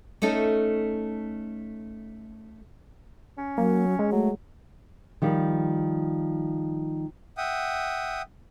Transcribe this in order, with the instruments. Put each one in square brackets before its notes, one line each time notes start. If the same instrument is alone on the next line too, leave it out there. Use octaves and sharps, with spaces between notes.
[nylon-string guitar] A3 C#4 D#4 A4
[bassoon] C#4
[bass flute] F#3 [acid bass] A#3
[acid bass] G#3
[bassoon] F#3 [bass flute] A3
[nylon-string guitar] D#3 F3 G3
[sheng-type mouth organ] E5 F#5 G5 D#6